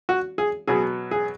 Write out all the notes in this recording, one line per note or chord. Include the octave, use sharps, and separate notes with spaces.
F#4
G#4
B2 F#3 B3 G#4
G#4